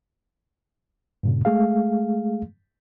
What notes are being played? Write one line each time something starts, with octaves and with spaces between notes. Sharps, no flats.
G2 A#2 C#3
G#3 A3 G#4 F5